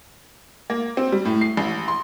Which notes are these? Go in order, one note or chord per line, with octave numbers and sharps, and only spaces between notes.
A#3
C4
G3
A2
C7
A1
C6